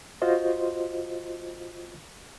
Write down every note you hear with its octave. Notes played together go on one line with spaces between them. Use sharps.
F4 F#4 C5 D#5